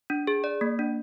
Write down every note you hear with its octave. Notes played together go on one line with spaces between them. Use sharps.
D4
G#4
D5
A#3
D4